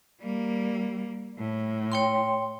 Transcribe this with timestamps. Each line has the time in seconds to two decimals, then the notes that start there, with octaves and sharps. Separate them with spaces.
0.21 G3 A#3
1.38 A2
1.92 C#5 G5 C6